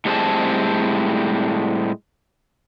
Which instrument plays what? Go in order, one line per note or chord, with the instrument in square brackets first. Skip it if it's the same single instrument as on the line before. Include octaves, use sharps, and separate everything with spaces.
[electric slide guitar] A2 G3 G#3 C4 G#4 A5